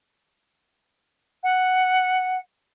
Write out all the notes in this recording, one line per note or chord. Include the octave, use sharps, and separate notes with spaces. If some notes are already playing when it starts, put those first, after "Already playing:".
F#5